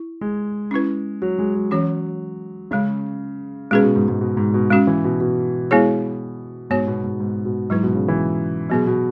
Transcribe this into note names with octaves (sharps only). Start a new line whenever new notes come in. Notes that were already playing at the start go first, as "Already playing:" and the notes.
Already playing: E4
G#3
C#4 E4 B4
F#3
G#3
F#3
E3 F#3 C#4 F#4 C#5
C#3 G#3 C#4 G#4
B2 G#3 C#4 G#4 B4
B2
G#2
G#2
B2
G#2
B2
G#3 C#4 F#4
E3
B2
B2
G#3 B3 E4 G#4 C#5
G#2 B3 F#4 C#5
B2
G#2
G#2
B2
G#2 F#3 E4 B4
B2
C#3
E3
B2 F#3 B3 G#4
B2